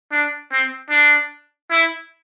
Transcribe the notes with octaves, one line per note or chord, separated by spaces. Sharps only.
D4
C4
D4
E4